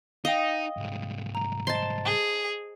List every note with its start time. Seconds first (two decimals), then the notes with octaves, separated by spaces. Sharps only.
0.25 D#4 D#5 F5 G5
0.77 C2 G#2
1.35 A#5
1.67 C5 D#5 A5 C6
2.05 G#4